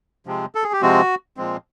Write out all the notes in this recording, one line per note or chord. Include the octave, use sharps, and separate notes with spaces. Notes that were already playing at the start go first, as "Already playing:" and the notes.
C3 F3 G#3 C4
A4
G#4
G4
C3 F3 G#3 C4 F#4
A#2 F3 G#3 C4